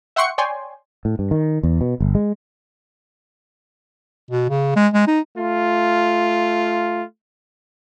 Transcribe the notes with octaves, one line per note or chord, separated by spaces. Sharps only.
E5 F#5 G5 C6 C#6 C#7
C#5 D5 G5 G#5 C6
A2
G2
D#3
E2
B2
G1
G#3
B2
C#3
G#3
G#3
D#4
A3 F4